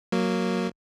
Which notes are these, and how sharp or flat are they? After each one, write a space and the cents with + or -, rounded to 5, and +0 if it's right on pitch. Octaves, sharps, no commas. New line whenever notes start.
F#3 +0 A#3 +0